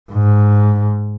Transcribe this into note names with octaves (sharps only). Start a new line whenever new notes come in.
G#2